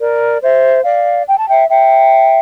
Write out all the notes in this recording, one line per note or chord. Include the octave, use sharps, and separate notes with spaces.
A#4 D5
C5 E5
D5 F5
G5
A5
E5 G5
E5 G5